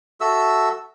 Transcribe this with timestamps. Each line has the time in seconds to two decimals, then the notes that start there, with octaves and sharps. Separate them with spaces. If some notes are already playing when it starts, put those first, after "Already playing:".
0.21 F#4 A4 E5 E6